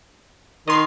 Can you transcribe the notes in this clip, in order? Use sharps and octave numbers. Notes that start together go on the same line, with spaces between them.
D#3 D#5 C6 C7